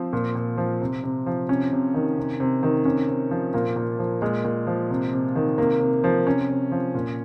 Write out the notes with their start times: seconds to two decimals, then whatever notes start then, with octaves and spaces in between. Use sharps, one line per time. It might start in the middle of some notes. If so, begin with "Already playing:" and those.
Already playing: F3 C4
0.13 A#2
0.35 A#2
0.57 F3
0.81 C3
1.04 C3
1.26 F3
1.49 C3 C#4
1.72 C3
1.94 D#3
2.17 C3
2.40 C3
2.63 D#3
2.85 C3 C#4
3.08 C3
3.31 F3
3.54 A#2 A#3
3.76 A#2
3.99 F3
4.22 A#2 G#3
4.44 A#2
4.67 F3
4.90 C3
5.13 C3
5.35 D#3
5.58 C3 A#3
5.80 C3
6.04 F3
6.26 C3 C#4
6.49 C3
6.72 F3
6.94 A#2